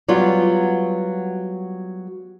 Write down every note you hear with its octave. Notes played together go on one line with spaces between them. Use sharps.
F#3 G3 B3 F4